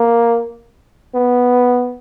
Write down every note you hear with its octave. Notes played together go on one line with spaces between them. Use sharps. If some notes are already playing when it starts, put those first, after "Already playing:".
Already playing: A#3
B3